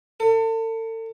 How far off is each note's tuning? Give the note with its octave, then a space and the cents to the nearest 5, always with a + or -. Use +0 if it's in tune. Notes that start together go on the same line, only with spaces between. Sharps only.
A4 +40